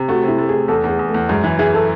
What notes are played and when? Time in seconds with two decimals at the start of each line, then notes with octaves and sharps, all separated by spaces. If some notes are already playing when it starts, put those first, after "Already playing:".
Already playing: C3
0.08 A3 F#4
0.24 C3 E4
0.38 A3
0.49 G#4
0.54 A3
0.68 E2 A4
0.84 E2 G#4
0.99 E2
1.08 A3
1.14 E2
1.29 F#2 G#3
1.44 E3
1.59 E3 G#4
1.74 A4